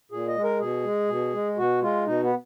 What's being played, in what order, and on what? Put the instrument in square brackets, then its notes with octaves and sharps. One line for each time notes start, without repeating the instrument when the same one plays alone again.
[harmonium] A#2 G#4
D#5
G#3
A#4
B2 G#4
G#3
B2
G#3
B2 F#4
G#3 F4
B2 D#4
B3